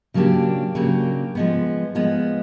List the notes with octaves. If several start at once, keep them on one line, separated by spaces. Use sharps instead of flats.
C#3 F#3 A#3 D4 G4
C#3 F#3 A#3 D4 G4
F3 G#3 B3
F3 G#3 B3